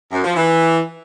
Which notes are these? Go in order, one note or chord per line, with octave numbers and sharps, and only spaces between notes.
F#2
F3
E3